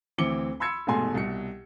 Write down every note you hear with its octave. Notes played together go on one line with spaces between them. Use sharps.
D2 E3 C4 D6 C#7 G7
B5 C6 E6 G#6 C#7
F1 G#2 B2 A3 G#5 C6
C2 B2 C#7